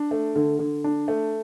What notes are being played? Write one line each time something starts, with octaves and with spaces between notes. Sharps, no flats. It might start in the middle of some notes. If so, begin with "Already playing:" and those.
Already playing: D4
A3
D3
D3
D4
A3